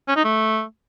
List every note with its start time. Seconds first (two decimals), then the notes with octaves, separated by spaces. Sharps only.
0.08 C#4
0.16 D#4
0.24 A3